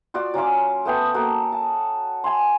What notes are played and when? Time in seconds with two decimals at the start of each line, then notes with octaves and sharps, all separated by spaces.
0.14 F4 F#4 D5
0.34 F#3 C#4 F4 D6
0.85 A3 B3 G5 D#6
1.14 A#3 F#4 A4
1.52 A5
2.24 G#5 C6